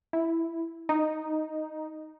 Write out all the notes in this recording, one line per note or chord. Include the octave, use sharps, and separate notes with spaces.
E4
D#4